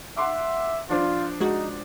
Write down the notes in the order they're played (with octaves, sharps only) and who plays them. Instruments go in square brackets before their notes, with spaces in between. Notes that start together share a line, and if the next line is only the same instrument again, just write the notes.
[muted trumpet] E5 [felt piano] F#5 C6 D6
[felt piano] F3 D4 C5 [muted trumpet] F4
[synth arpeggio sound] G#3 F#4 [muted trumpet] D#4